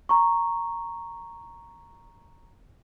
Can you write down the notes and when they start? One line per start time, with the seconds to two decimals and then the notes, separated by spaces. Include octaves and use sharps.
0.09 A#5 C#6